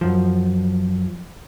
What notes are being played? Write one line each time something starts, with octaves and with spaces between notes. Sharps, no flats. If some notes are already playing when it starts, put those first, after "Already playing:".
F#2 F3